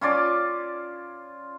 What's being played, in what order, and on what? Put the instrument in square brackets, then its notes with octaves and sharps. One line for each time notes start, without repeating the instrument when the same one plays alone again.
[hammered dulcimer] C#4 F4 D5 A5